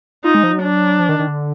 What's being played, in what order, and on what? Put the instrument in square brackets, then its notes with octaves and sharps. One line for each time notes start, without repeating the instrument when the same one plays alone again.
[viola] D#4 [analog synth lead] F4
[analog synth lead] G#3
F3
F#3
[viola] D4
[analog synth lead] F3
D#3
D#3
D3